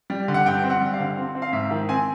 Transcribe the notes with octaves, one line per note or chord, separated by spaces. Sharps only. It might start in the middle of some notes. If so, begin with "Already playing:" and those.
G3
D3
F#5
G2 G5
C4
F#5
G3
F5
D3
C4
C4
F5
G#2 E5
D#3
C4 G#5